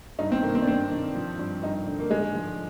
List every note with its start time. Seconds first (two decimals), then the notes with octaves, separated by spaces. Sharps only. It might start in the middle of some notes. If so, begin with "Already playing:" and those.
0.19 G2 D#4
0.32 C4
0.43 D#3 A#3
0.55 C4
0.62 D4
0.67 G2 C4
0.91 D#3
1.15 F3
1.39 G2
1.63 G2 D#4
1.87 D3
2.00 A#3
2.10 G#2 G#3
2.35 F3